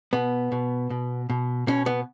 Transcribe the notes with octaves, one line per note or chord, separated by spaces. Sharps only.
B2 B3
B2
B2
B2
B2 C#4
B3